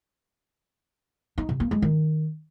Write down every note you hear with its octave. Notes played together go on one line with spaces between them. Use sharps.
D#4
C3
A#3
G#3
D#3